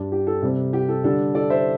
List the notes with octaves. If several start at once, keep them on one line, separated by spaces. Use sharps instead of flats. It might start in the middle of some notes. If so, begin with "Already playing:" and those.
Already playing: G2 G3 D4
G4
A4
C3 G3 C4
G4
A4
D3 G3 D4 A4
A4 D5
C5 E5